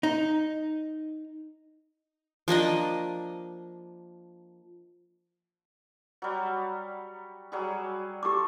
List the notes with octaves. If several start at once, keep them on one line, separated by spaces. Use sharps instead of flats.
D#4
F3 A#3 D4 D#5
F#3 G3
F#3 G3 G#4
G4 A4 C6 D6